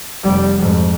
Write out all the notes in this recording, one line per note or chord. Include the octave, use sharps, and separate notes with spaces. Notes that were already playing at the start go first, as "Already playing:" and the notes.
F1 G3
F2 G#2